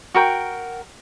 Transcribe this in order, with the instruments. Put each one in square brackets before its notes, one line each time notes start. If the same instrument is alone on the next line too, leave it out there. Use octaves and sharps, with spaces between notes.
[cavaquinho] F#4 A#4 G5